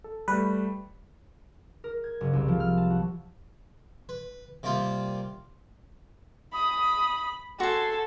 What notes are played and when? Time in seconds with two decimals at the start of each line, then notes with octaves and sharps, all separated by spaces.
0.04 A4
0.28 G3 A3 B4
1.84 A#4
2.04 G#6
2.21 F#1
2.33 C2
2.48 F3
2.60 F6
2.77 A5
2.90 F#4
4.09 B4
4.63 C3 G3 A#3 F4 D#6
6.53 B5 D#6
7.60 F#4 A4 G#5 C6